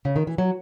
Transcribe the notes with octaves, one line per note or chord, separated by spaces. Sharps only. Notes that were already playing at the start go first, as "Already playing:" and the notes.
C#3
D#3
E3
F#3